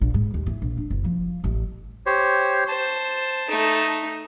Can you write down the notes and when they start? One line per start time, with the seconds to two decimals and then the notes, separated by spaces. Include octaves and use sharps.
0.01 A#1
0.14 G#2
0.34 D#2
0.46 E3
0.62 A#1
0.77 D4
0.90 F#1
1.04 F3
1.44 A1
2.06 G4 C5 C#5
2.68 C5 A5
3.49 A3 D#4